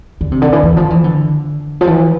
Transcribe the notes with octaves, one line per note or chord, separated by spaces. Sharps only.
D3
C3
D3
E3
E3
F3
E3
D3
F3
E3